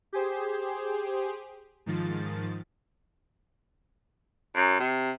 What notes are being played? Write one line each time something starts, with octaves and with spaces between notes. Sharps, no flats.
G4 G#4 C5
G#2 D#3 F3 A6
F#2
C3